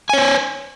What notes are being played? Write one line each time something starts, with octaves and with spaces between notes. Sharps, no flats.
C5 C#5 G#5